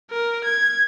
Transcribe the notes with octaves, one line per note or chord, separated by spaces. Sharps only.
A#4
G#6